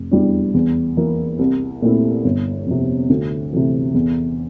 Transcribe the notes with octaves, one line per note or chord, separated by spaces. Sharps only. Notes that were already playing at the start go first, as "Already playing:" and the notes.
Already playing: F1
E2 E3 G3 D4
E2
E3 A#3 E4
C2
A#2 A3 C4 E4
G1
F2 C3
D2
C3 E3 A3
E2